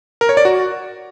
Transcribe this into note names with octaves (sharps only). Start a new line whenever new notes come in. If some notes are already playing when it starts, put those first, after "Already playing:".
A#4
C#5
D5
F#4